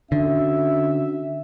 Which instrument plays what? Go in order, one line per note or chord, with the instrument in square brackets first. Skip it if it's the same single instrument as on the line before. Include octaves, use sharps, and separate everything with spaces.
[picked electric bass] D3 [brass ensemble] C#4 F#4 E5